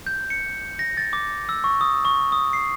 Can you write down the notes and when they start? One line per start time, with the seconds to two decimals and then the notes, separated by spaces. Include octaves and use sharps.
0.07 G6
0.30 C#7
0.79 A#6
0.97 A6
1.13 D6
1.49 E6
1.64 C#6
1.81 D#6
2.05 C#6
2.32 D#6
2.53 C7